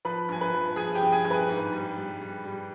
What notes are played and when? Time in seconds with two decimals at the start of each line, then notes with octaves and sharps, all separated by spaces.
0.05 F3 B4 B5
0.29 G2 G#5
0.41 B4 B5
0.53 F3
0.76 F3 G#4 G#5
0.95 G4 G5
1.01 G2
1.12 G#4 G#5
1.25 G2 G#5
1.30 B4 B5
1.49 G#2
1.73 G3
1.97 G3
2.21 G3
2.45 G3